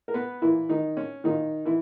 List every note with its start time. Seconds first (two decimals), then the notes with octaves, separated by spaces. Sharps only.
0.08 A#4
0.14 B3 B4
0.42 A#2 E3 E4
0.69 D#3 D#4
0.97 C#4
1.24 A#2 D#3 D#4
1.65 E3 E4